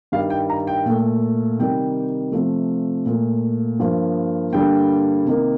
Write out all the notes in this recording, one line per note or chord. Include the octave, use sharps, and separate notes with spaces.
G2 D#3 G3 F5
G5
A#5
G5
A#2 A3
C3 D#3 G3 G5
C3 F3 A3
A#2 A3
G2 F3 A#3
G2 D3 G3 A#3 G5
C3 D#3 A#3